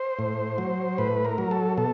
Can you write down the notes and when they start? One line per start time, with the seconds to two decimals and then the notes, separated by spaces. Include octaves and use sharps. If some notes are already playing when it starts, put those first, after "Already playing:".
Already playing: C5
0.19 A2
0.58 F#3
0.98 A2 B4
1.25 A#4
1.38 F#3
1.51 A4
1.77 B2 A4